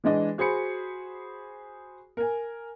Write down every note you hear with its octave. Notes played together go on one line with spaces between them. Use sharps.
E3 G#3 D4 D#5
F#4 G#4 C5 B5 C#7
A#4 G#5